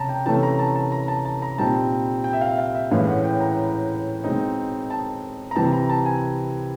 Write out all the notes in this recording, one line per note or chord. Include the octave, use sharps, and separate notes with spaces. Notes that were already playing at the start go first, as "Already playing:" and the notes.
Already playing: C3 C#4 A5 A#5
G5
C3 E3 A3 C#4 A5
A#5
A5
A5
A#5
A5
A5
A#5
A#2 G3 C4 D#4 A5
G5
E5
F5
F5
E5
A2 E3 G#3 C#4 F5
F#5
G5
A#5
B2 G#3 C4 D#4
A5
A#5
C3 E3 G3 C4 A5
A#5
A5
G#5